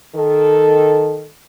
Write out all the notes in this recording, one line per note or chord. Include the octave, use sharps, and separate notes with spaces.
D#3 A4